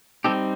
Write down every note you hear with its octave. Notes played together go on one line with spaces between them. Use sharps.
G3 C4 D#4 G4 A4